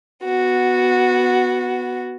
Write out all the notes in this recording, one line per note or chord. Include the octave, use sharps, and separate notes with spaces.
B3 F#4